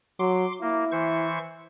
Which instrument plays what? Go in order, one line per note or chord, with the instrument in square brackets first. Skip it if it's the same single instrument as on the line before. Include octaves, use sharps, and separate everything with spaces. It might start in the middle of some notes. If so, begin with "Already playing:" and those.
[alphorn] F#3 [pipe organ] C6 D6
[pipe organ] A#3 [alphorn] E4
[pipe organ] E3 C5 C#6